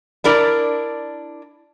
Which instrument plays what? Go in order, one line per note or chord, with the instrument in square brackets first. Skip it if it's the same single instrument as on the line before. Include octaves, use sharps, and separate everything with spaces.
[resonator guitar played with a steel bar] D4 E4 A#4 D5